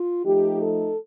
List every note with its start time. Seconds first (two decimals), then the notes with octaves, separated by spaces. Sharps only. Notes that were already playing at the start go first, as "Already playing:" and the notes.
Already playing: F4
0.24 F3 A3 D#4 G4
0.59 A4